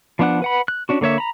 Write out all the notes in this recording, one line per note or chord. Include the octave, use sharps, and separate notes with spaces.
F3 B3 D4 F#5 F#6
B4 F#5 B5
F#6
C#4 D4 F#4
D3 A#3 C#5 E5
A#5 B5